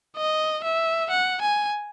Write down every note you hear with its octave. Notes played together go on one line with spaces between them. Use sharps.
D#5
E5
F#5
G#5